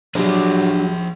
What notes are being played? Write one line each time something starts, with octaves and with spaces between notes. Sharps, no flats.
F3 F#3 D4 G4 G#4